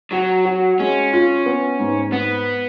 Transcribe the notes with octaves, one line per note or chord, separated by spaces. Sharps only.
F#3 F#4
F#4
G#3 C#4
F4
B3
G#2
G#2 B3